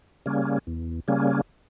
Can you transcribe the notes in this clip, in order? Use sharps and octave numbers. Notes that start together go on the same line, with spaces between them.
C#3 G3 A#3 C#4
E2
C#3 G3 A#3 C#4